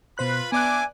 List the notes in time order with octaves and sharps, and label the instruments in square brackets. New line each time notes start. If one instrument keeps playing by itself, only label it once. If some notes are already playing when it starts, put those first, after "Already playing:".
[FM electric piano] B2 C5 F#6 [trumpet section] F4 B4 B5
[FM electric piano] B3 D5 F#6 [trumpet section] D4 E5 D6 [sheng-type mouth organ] G#5